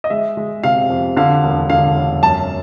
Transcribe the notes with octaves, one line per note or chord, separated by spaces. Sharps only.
D#5
G#3 E5
G#3
C3 F5
F2
D3 F5
E1
D3 F5
E1
F#2 A5